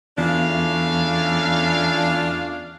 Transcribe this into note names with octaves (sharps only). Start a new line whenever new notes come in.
E2 C#3 A3 D4 F4 F5